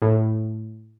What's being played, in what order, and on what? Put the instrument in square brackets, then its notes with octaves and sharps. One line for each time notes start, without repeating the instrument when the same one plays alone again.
[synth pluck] A2